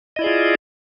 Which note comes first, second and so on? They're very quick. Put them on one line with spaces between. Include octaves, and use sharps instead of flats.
D#5 E4 D5 G#4 F4